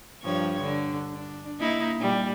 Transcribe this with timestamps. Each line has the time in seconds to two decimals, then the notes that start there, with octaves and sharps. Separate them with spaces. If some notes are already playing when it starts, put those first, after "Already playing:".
0.24 G2 F3 C#5
0.62 D3
1.12 D4
1.60 A#3 D#4 E4
1.98 A#2 G3